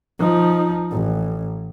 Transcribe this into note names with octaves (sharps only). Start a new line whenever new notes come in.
F3 D#4
A1